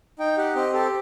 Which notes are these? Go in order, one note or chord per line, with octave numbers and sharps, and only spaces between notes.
D#4 G5
G4 F#5
C4 D#5
G4 A4